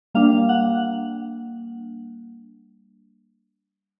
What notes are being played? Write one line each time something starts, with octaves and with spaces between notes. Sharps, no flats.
G3 A#3 D4 F5
F#5